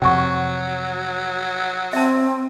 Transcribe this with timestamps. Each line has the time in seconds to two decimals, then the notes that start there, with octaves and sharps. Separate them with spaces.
0.02 F2 C3 F#3 F#5 G#5 C#6
1.93 C4 E5 A5